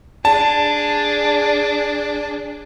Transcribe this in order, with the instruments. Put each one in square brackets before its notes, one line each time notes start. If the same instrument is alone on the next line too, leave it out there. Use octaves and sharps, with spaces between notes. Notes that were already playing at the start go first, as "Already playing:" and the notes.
[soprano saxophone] D4 [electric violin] G#4 [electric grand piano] A5